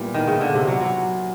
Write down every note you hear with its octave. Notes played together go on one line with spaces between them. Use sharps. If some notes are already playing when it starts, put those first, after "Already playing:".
Already playing: A#2 G3 B3 E4
D#3
C#3
D3
C3
F#3
F#3